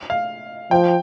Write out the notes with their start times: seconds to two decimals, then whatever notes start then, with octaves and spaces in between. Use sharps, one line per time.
0.10 F5
0.71 F3 G5